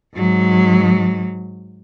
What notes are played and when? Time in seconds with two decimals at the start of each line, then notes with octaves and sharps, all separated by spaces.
0.15 G#2 F#3